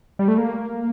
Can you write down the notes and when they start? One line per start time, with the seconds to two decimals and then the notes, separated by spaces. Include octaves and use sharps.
0.19 G3
0.28 A3
0.38 A#3